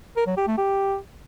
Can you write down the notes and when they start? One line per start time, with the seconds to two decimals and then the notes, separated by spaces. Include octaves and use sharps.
0.17 A#4
0.27 F#3
0.37 G4
0.47 A3
0.58 G4